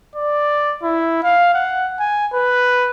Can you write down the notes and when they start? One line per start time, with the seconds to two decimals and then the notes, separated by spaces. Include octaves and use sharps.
0.16 D5
0.83 E4
1.23 F5
1.54 F#5
1.99 G#5
2.34 B4